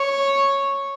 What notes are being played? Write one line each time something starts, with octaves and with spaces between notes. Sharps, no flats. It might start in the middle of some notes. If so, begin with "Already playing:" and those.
Already playing: C#5